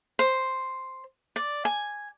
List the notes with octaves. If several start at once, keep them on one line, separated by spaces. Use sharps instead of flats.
C5
D5
G#5